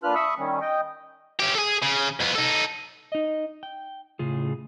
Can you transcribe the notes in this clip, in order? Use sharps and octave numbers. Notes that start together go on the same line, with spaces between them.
A#2 D4 F4 B4 F6 F#6
E5 B5 C#6 D#6 E6
D#3 G3 C#4
D#5 G5
C#4 G4
G#4 A4
C#3
F2 B3
D#4 A4
D#4 D#5
G5
A2 C#3 F4 G#4